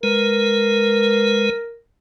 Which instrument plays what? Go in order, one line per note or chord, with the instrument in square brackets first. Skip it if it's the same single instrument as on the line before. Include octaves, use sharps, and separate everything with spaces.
[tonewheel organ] G#3 B4 [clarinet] A#4